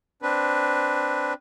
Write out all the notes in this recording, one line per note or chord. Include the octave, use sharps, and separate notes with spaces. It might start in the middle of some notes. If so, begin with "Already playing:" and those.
C4 D4 B4